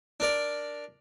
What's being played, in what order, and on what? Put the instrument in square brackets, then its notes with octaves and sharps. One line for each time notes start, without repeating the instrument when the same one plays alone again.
[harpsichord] D4 A#4 D5